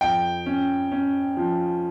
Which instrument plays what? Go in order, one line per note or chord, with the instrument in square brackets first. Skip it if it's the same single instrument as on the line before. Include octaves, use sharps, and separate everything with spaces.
[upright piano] F2 [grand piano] G5
[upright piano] C#4
C#4
F3